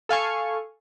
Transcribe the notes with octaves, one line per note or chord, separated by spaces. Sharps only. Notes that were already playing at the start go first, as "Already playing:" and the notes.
A4 F5 G#5 C#6